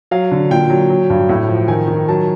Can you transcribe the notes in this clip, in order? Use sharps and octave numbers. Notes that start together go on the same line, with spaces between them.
F#3 F5
D3
A#2 G5
F#3
F#3
G2
A2
F3
D#3 G#5
D#3
F#3 A5